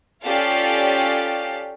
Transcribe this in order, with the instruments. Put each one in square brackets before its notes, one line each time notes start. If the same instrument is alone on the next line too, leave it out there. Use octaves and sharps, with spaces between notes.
[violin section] C#4 F4 G4 A4 D5 F5